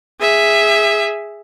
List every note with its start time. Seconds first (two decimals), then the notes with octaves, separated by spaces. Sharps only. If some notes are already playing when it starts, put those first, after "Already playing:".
0.20 G#4 E5